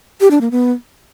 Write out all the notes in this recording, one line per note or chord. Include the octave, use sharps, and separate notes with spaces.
G4
D4
A#3
B3